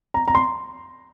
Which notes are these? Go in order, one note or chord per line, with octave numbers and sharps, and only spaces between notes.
A#5
A#5
C6